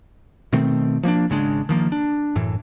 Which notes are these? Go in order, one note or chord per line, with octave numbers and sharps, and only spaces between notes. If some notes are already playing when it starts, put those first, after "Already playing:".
B2 D#3 A3 C4
F3 A#3 C4 D4
G#1 C#3 G#3 D4
D#3 F3 A#3
D4
F#1 F#2 A2 E3